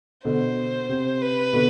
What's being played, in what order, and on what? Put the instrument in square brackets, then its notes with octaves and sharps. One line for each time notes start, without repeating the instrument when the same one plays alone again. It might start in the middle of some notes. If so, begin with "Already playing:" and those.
[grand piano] B2 D3 [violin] C5
[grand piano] C3
[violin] B4
[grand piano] B2 D3